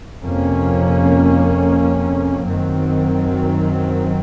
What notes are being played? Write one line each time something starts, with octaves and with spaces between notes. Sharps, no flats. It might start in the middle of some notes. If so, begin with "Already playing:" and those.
F2 C3 F3 A#3 C#4
F#2 D#3 F#3 C4